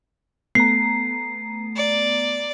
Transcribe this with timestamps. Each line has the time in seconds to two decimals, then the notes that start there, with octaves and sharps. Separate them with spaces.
0.55 A3 B3 A#5 C7
1.76 D5